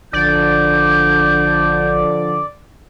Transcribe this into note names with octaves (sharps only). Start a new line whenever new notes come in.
A1 D3 F3 D5 G6